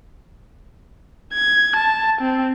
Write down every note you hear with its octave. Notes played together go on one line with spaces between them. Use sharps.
G#6
A5
C4